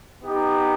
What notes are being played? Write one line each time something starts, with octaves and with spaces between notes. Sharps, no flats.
B3 D#4 G4